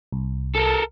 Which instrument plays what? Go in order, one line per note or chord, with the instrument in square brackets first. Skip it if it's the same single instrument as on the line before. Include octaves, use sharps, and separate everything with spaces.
[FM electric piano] C2
[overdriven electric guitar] A4 A#4